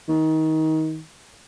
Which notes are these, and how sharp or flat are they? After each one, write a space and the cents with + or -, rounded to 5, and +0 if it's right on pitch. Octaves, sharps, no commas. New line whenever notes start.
D#3 +25